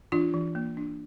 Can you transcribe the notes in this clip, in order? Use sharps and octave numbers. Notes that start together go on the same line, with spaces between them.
E3 D4 F4
E3
A#3
D4